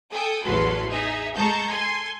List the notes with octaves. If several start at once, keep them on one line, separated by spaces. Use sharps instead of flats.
A4 G5 G#5 D#6
A1 E2 F#3 A4 B4 C6
D#4 G#4 E5
G#3 A4 A5 A#5 C#6 G6
A4 G#5 C6